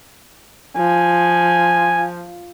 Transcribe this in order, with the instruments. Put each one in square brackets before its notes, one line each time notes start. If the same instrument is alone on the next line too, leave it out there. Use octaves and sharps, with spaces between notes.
[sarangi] F3 [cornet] G#5